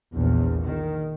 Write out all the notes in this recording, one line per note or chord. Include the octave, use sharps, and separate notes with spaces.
A#1 E2
D#3